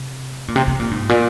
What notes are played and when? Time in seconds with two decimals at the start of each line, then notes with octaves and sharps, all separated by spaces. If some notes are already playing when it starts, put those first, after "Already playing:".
Already playing: C3
0.48 A#2
0.56 C3
0.67 C3
0.80 A#2
0.91 G#2
1.09 A#2